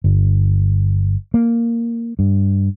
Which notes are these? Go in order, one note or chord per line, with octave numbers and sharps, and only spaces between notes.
G1
A#3
G2